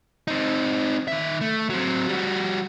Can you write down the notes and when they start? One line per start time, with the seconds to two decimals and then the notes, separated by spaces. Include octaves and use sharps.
0.28 C4 D#4
1.08 D#3 E5
1.41 A3
1.69 F#3 C4
2.08 G3 F#4